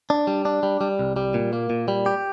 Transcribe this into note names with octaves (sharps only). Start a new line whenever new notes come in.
D4
G3
D4
G3
G3
C2
G3
A#2
A#3
A#2
G3
G4